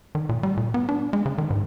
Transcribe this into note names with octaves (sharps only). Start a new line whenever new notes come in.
D#3
A#2
G3
A#2
B3
D4
G#3
C#3
D#3
G#2